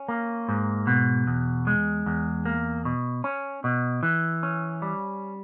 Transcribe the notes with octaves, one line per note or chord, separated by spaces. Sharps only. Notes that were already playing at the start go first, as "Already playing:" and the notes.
Already playing: C#4
A#3
G#2
B2
E2
G#3
E2
A#3
B2
C#4
B2
E3
C#4
G3